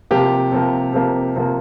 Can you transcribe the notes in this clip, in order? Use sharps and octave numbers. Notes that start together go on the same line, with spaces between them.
C3 F3 A#3 G4
C3 F3 A#3
C3 F3 A#3
C3 F3 A#3